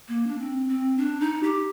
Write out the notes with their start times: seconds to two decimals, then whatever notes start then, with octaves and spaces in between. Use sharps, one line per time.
0.08 A#3
0.27 D4
0.39 C4
0.68 C4
0.98 D4
1.21 D#4
1.43 G4